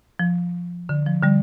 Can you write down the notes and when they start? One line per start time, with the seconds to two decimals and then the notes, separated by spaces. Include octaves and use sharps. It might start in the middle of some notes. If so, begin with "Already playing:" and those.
0.19 F3
0.89 D3
1.06 F3
1.23 D3 G3